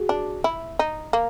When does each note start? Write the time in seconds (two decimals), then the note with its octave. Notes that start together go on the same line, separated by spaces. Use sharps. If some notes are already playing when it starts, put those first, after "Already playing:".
Already playing: F#4 G#4
0.09 D4
0.44 E4
0.79 D#4
1.13 A#3